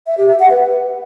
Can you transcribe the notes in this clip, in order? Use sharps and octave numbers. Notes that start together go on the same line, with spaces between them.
E5
G4
E5
F#5
B4